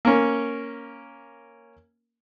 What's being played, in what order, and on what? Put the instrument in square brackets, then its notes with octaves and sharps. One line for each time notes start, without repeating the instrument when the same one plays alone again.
[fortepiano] A#3 C#4